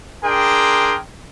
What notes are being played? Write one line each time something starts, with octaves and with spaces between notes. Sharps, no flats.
D4 G#4 A#4 G5 C6